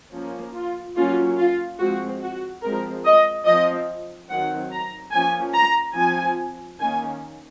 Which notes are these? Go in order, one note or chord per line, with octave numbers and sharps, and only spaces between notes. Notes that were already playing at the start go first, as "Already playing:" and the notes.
F3 A#3 C#4
F4
F#3 A#3 C#4 F4
F4
F3 G#3 C4 F#4
F#4
F3 G#3 C4 A#4
D#5
F3 C4 D#5
D#3 F#3 C4 F#5
A#5
F3 A#3 C#4 G#5
A#5
F3 C4 G#5
D#3 A#3 C#4 G#5